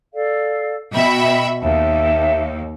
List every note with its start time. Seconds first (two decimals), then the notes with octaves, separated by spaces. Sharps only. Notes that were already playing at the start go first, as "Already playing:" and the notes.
0.13 A4 D5 F5
0.94 B2 D#5 E5 G5 B5
1.63 D#2 E5 G5 A5